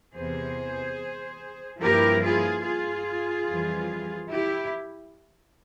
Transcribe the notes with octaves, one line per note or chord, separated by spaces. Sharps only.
E2 C3 E3 G#4 C5
G2 F3 A#3 E4 G4 A#4
F4 G#4
F4 G#4
F2 E3 G3
E4 G4